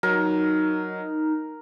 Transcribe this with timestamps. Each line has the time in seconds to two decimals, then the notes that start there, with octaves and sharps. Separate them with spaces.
0.03 F#3 D#4 A#4